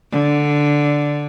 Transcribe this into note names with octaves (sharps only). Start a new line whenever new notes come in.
D3